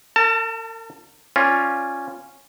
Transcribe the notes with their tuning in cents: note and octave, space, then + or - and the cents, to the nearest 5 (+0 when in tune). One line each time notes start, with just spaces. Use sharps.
A#4 -45 A5 +20
C#4 -10 F4 +0 D5 -10